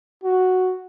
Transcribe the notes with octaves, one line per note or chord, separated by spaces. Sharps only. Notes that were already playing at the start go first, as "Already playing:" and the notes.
F#4